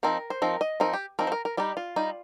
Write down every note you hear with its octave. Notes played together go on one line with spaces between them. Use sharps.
F3 C4 D#4 A#4
C5
F3 C4 D#4 A#4
D#5
F3 C4 D#4 A#4
G4
F3 C4 D#4 A#4
C5
A#4
A#4
G3 D#4 G4
F4
G3 D#4